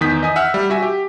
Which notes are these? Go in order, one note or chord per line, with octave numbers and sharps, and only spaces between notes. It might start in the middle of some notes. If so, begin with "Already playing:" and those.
E2 D#3 D#6 G6 B6
D#5 G#5 D#6
E5 F#5 E6 F6
G3
F#4 E5 G#5 B6
G4